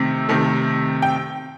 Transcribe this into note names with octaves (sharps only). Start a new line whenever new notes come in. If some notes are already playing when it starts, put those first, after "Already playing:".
Already playing: C3 D#3 A3
C3 D#3 A3
G5